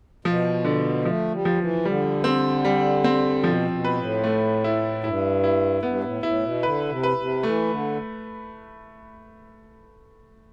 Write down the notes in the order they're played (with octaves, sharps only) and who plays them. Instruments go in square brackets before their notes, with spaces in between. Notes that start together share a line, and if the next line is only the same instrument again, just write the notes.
[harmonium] B2 [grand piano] F3
[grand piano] D3
[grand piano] F3 [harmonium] A3
[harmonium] G3
[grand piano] F3
[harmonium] E3
[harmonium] D3 [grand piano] G3
[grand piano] C4
G3
C4
[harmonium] B2 [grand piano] F3
[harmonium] A2
B2
[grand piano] B4
[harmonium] A2
[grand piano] A3
E4
[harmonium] G2 [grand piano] E4
[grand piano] E4
[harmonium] G2 [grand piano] B3
[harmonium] A2
[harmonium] A2 [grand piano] E4
[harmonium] B2
[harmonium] D3 [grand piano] B4
[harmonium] C3
[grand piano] B4
[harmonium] C3
[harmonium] E3 [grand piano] A3
[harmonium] D3